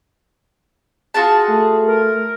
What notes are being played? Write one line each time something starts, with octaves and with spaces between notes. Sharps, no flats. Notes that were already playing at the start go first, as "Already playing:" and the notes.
F4 F#4 G#4 A5
A3
A#4